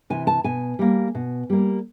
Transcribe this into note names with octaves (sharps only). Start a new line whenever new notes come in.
C3 E3 G#5
A5
B2 G#5
G3 A#3
B2
G3 A#3